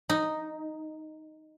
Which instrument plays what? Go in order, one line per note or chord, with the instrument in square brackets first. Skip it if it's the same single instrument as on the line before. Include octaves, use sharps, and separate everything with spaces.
[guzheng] D#4